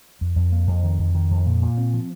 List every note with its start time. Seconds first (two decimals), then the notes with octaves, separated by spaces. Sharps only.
0.21 F2
0.36 F2
0.52 A#3
0.67 F2
0.83 D#3
0.99 F2
1.14 D#3
1.31 F2
1.46 A#2
1.62 A#2
1.78 C4
1.94 F3